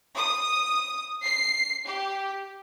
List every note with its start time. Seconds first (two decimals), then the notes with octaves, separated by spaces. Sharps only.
0.16 D#6
1.23 C7
1.86 G4